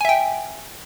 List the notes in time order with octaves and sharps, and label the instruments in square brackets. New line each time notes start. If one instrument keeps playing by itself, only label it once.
[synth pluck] G#5
E5
G5